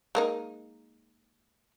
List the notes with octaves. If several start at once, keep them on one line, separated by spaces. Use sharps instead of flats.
G#3 A#3 D#4